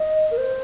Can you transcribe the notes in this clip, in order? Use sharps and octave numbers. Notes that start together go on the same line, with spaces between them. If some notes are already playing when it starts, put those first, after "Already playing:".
Already playing: D#5
A#4
C5